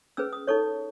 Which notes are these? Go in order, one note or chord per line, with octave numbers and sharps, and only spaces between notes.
C#4 G#4 B4 E6
D#6
D#4 A4 C#5 C#6